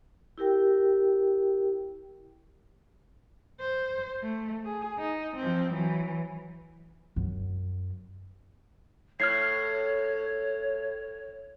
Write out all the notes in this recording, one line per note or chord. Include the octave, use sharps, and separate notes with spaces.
E4 G4 A#4 G5
C5
A3
G#4
D#4
F3 C4
E3 F#3
F#2
A2 C#5 F6 G#6 C7